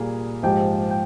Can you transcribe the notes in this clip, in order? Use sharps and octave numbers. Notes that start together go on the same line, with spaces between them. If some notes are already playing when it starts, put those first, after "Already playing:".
Already playing: A#2 G3 A#3 G#4
G#2 F3 G#3 G4 G5
G5